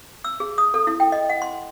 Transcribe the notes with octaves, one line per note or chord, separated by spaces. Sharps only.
E6
G#4
D#6
A4
E4
G5
D#5
F#5
C6